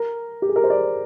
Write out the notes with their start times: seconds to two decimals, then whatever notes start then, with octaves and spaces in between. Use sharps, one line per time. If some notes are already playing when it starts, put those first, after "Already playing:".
Already playing: A#4
0.42 G4
0.49 G#4
0.56 A#4
0.64 C5
0.70 D5